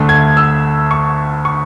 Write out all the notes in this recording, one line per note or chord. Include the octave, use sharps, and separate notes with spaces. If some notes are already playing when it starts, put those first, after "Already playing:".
Already playing: D2 D3 A3
G#6
E6
C#6
C#6